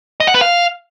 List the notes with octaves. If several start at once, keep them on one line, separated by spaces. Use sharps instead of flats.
D#5
F#5
B4
F5